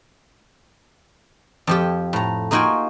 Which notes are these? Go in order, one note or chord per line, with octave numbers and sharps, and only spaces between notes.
F2 F3 G4
A2 A#5
A#3 D#4 F4 F#4 G5 G#5